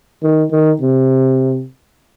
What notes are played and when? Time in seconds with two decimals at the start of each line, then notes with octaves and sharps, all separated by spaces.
0.23 D#3
0.51 D#3
0.81 C3